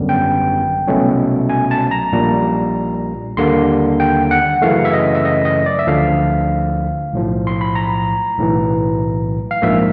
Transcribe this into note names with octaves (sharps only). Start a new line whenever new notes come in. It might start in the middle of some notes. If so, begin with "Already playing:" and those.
Already playing: G#1 F#2 D3 G3 B3
G5
C2 B2 F#3 A3 C#4
G#5
A5
A#5
A#1 A#2 G3
D#2 D3 G3 A#3 C6
G5
F#5
F#2 C#3 E3 A3 F5
E5
D#5
E5
D#5
D#5
D5
E5
D2 D3 F3 F5
B1 A2 F3
C6
B5
A#5
B1 A2 E3
F5
A#1 G#2 F3 A#3 E5